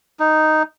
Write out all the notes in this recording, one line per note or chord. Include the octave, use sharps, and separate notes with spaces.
D#4